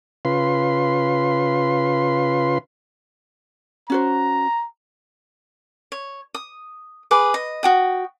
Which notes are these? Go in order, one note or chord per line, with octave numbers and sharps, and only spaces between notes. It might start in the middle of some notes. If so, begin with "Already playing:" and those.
C#3 F4 B4 C6
C#4 F#4 C5 A#5
C#5
D#6
G#4 B4 D6
D#5
F#4 G5 D#6